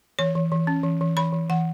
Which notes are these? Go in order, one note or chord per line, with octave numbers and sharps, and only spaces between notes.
E3 C#5
E3
E3
C#4
E3
E3
E3 B5
E3
E3 F#5